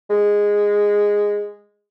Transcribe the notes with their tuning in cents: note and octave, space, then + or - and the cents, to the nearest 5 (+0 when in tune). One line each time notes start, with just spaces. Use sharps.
G#3 -10